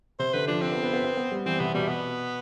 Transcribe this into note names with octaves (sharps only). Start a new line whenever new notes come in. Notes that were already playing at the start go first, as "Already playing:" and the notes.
C3 C5
D3 B4
F3 D4
C4
B3
B3
B3
B3
B3
G3
E3 C4
C3 B3
B2 G3
B3